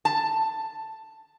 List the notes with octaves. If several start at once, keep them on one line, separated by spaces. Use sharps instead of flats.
A5